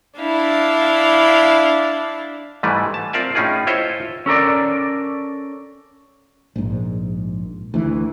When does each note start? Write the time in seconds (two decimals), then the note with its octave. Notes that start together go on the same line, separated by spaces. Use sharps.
0.19 D4 E4 F5
2.63 G#2 E3 G3 A3 B4
2.94 A5
3.13 C4 F4 A#4 D5 E5 A5
3.35 A2 C#4 D#4 F4 G#4
3.67 E4 F4 C5 C#5 D#5 E5
4.26 C#4 A4 A#4 D5
6.56 A#1 G#2
7.74 D2 E3